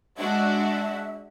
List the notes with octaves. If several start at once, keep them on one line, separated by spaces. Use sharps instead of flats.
G#3 D4 F#4 E5